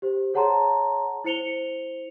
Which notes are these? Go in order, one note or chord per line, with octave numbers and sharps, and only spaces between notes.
G4 C5
G#4 C#5 F#5 A5 A#5 C6
E4 C5 C#7 F7 G7